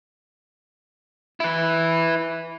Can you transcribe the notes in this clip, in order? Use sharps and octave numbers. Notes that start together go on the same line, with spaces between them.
E4 B4